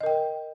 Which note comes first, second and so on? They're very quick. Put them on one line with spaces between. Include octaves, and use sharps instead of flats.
D#5 A#4 G5